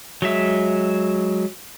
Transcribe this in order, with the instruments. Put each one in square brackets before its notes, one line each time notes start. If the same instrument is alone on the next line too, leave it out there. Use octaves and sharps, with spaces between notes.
[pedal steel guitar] F#3 G#3 E5